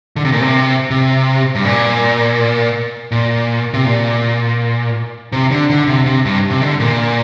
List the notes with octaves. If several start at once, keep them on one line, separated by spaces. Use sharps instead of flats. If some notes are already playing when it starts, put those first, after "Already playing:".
D3
C3
A#2
C3
C3
G2
A#2
A#2
C3
A#2
C3
D3
D3
C3
C3
G2
C3
D3
A#2